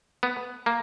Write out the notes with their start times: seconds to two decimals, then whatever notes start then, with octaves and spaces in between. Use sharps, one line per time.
0.23 B3
0.66 A#3